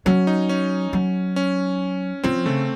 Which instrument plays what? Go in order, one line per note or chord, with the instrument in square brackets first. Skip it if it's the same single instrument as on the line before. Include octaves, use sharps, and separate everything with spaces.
[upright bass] F#3 [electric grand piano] C#4
[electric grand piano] D#4
C#4
[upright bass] F#3
[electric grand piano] C#4
[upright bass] F3 [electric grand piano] C4
[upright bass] C#3 [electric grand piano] A3